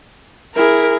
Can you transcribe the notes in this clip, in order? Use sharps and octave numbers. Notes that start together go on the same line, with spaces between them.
E4 G#4 A#4